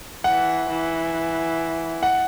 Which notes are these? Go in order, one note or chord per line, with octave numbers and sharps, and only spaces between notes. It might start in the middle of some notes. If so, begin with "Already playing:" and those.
E3 F#5
E3
F#5